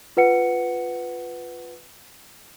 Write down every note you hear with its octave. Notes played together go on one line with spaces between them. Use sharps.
F4 B4 F#5 C#7